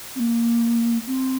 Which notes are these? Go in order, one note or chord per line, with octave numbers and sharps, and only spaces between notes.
C4
A#3
C4